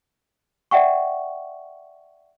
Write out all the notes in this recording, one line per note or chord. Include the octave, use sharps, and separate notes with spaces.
D5 E5 F#5 G5 C#6